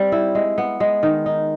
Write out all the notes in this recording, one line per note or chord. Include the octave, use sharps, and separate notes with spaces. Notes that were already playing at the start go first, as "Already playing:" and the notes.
Already playing: G3 C4
E4
G#3
B3
G#3
D#3
D#4